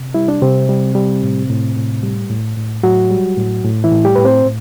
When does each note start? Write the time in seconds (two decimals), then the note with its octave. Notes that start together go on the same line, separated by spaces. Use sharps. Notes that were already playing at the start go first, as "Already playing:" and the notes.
Already playing: C3
0.14 G3 E4
0.28 D4
0.42 C3 G3 C4
0.69 G3
0.95 G3
1.23 A2
1.50 A2
1.77 A2
2.03 G3
2.29 A2
2.57 A2
2.83 A2 F#3 F#4
3.10 G3
3.37 A2
3.64 A2
3.84 E3 E4
3.92 A2
4.04 G3 G4
4.16 A2 B4
4.25 C4 C5
4.45 A2